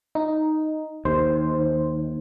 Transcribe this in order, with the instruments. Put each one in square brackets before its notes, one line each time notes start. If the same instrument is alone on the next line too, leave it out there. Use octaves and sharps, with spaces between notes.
[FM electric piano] D#4
[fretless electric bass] D#2 [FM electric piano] C5